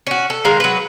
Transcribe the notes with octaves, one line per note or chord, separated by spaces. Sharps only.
C#4 F#4
A4
D#3 G#3 A#4 F5
F#3 B4